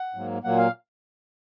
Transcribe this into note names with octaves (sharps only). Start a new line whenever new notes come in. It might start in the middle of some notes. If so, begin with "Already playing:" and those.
Already playing: F#5
G#2 F#3 A#3
A#2 F#3 A#3 F#5
F5